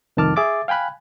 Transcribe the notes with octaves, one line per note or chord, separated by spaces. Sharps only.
C2 F2 D#3 A5 D6 F6
G#4 E5 D6 A6
F5 G5 G#5 B5 F#6